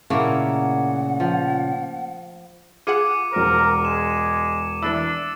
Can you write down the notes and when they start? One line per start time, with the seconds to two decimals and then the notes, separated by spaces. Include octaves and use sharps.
0.10 A#2 C#3 A3 A#3 E4 F#5
1.20 F3
2.87 F4 G#4 F#5 D6 C#7 D#7
3.32 E1 A#4 C5
3.85 G#3 E7
4.83 E3 A3 D4 E4 E6 A6